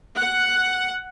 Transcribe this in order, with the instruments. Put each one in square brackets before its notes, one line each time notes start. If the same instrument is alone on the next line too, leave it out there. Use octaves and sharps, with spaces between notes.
[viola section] F#5